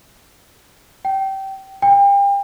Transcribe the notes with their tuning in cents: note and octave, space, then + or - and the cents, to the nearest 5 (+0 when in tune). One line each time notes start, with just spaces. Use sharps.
G5 -20
G5 +35